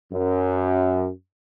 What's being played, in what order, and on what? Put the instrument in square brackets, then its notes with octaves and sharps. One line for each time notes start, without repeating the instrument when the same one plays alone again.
[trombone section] F#2